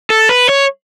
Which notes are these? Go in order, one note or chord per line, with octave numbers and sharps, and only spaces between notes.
A4
B4
C#5